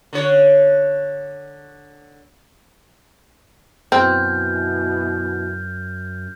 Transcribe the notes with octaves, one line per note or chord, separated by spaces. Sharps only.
D3 C#5
F#2 B2 E3 C4 F6 G6